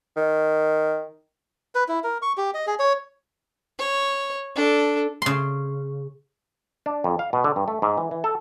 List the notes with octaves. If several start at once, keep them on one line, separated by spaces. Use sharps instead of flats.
D#3
B4
E4
A#4
C#6
G4
D#5
G#4
C#5
C#5
D4 A4
C#3 C6
D4
F2
F5
B2
D3
G2
A3
G#2
E3
E3
A4